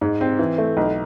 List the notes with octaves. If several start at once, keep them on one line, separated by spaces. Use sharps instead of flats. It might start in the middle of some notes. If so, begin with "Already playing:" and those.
G#2
C4
E3
A3
B1